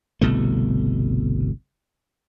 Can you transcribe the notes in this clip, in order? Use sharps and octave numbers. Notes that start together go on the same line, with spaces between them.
G1 C2 B2 A3